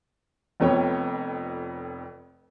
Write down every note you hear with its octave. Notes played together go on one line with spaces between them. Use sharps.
F1 F2 B3 C#5 G5